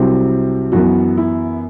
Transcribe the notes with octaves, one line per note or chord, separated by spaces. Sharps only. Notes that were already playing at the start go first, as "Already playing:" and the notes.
Already playing: C2 C3 F#3 C4
F#2 E3 B3 F#4
E4